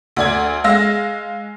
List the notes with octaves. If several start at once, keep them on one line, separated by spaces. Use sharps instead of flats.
D2 D5 G#6
G#3 F5 E6 A#6